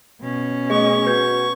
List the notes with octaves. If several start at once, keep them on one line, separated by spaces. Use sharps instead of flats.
B2 C#4
A3 G#4 D#5 C#6
F#4 B4 G6 G#6